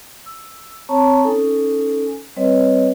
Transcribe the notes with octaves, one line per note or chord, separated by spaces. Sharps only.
E6
C4 C#5 A5 A#5 C#6
C#4 D#4 A4 G#5
G3 C4 B4 C#5 D#5